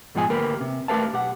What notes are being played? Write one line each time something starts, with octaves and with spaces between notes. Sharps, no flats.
G#2 B2 F3 G#3 F#5 G#5
D2 A#3 G4 A#4 B4
C3
A3 G4 A#4 B4 F5 A5
B1 G4 F#5